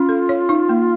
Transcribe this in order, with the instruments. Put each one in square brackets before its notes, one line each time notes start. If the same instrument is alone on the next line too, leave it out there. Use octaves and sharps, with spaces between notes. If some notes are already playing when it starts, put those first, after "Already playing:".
Already playing: [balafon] C#4 [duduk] F4
[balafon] A4
C#5
D#4
A#3